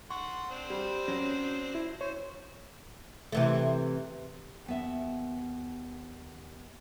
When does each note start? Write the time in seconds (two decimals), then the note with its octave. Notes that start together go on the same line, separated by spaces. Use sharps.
0.10 F#5 C6 C#6
0.51 C4 D4 C5
0.70 G3
1.08 F#3 C#4
1.75 E4
2.01 C5 C#5
3.32 C3 E3 A3
4.66 D#2 B3 E5